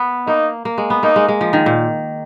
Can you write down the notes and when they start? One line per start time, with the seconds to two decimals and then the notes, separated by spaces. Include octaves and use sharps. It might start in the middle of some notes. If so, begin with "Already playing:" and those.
Already playing: B3
0.27 A#3 D#4
0.65 A#3
0.78 G#3
0.90 B3
1.03 A#3 D#4
1.16 G#3
1.29 G#3
1.41 F3
1.53 D#3
1.66 A#2